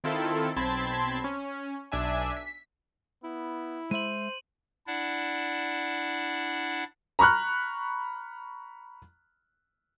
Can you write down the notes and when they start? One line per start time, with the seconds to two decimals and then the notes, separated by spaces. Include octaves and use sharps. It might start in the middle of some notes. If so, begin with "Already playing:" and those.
0.04 D#3 C4 E4 F4 A4
0.57 B1 C4 A5 B5 C6 G#6
1.24 C#4
1.92 B1 D4 E5 G#5
2.37 B6
3.24 B3 E4
3.91 G#3 C5 E5 D#7 F#7
4.87 D4 E4 D5 F#5
7.19 A#5 B5 C#6 F6 F#6